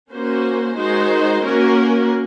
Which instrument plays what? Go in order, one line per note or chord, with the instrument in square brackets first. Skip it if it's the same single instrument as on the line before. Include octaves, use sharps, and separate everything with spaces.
[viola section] A#3 C#4 F#4 C5
D#3 G#3 D#4 F#4 C5
A#3 C#4 F#4 A#4